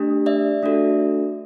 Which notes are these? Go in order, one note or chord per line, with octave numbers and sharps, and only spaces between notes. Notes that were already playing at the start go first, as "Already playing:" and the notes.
Already playing: A3 D4 G4
D5 E5
A3 D4 F#4 A4